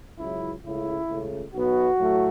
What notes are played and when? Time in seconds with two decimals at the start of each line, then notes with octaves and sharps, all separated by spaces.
0.19 C#2 C#3 F#3 E4
0.63 C#2 C#3 A3 E4
1.08 C#2 C#3 A3
1.53 B1 B2 B3 F#4
1.98 A2 F#3 A3